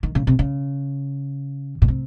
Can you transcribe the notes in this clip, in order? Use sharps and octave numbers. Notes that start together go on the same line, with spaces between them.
D#3
C#3
C3
C#3
A#2
C3